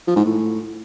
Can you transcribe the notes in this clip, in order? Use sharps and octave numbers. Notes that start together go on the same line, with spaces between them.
F3
G#2
A2